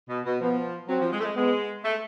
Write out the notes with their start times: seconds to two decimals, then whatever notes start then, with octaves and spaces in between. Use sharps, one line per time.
0.09 B2
0.25 B2
0.41 F3 B3
0.88 F#3 C4
1.01 F3
1.13 G#3
1.20 A3
1.24 G#3
1.36 G#3 B3
1.84 A3